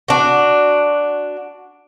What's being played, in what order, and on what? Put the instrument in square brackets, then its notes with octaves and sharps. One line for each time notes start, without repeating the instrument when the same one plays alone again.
[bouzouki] D4 F#4